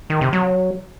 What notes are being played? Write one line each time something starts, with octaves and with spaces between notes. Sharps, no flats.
D#3
C3
F#3